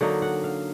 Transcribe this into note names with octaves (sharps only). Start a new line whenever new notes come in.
D3 F#3 A#3 D#4 F#5
F#5
F5